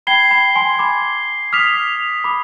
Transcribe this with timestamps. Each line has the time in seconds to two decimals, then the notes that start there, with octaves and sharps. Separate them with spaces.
0.07 G5 B5 G#6 C7 G7
0.31 G5 B5
0.55 G#5 C6
0.79 B5 D6
1.52 D6 D#6 F6 B6 F7
2.24 B5 D6